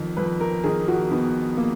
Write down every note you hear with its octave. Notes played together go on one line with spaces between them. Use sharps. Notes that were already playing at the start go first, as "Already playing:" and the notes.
Already playing: F2 D#3
F2 B4
A#4
D#3 G#4
F#4
D#3 B3
A#3